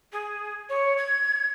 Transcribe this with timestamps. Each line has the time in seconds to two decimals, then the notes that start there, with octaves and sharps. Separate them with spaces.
0.13 G#4
0.70 C#5
0.98 G#6